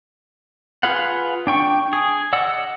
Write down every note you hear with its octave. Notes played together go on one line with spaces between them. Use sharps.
F4 G#4 B4 F5 F#5
D4 G5 C#6
G#4
D5 D#5 F#5 E6